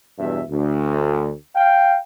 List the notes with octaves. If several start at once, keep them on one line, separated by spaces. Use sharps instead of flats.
E2 G2 B2 E5
D2
F5 G5